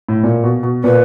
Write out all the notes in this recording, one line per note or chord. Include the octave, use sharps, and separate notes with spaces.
A2
A#2
B2
B2
A#2 B4